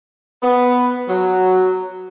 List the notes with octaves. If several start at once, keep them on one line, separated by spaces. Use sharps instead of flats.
B3
F#3